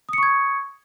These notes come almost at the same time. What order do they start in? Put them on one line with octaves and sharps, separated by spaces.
D#6 C#7 C#6 G#6